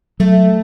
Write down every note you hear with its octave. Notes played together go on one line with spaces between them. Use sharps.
F#3 A3